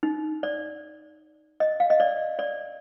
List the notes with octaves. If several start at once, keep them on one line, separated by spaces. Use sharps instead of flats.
D#4
D5
D#5
F5
D#5
D5
D5